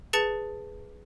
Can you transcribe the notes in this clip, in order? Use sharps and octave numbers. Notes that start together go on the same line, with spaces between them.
G#4 B4 A5 A6 C#7